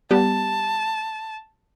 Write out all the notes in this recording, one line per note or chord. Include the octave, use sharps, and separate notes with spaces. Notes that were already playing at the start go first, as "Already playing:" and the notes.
G3 B3 G4 A5